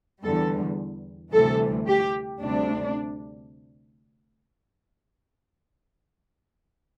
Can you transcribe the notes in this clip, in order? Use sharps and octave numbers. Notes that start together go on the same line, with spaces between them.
E2 D3 G3 A4
D2 C3 E3 G3 A4
G4
D2 C3 G3 D4